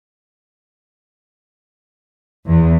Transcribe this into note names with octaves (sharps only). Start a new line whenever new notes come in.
E2